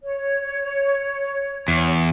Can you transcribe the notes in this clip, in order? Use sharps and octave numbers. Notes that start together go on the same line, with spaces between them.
C#5
E2